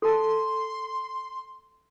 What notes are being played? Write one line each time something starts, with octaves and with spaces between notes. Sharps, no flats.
A4 A5 C6